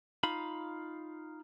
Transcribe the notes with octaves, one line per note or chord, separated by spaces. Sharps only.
D#4 F4 F5 B5